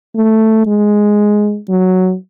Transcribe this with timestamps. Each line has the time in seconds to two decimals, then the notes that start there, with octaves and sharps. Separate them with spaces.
0.16 A3
0.67 G#3
1.69 F#3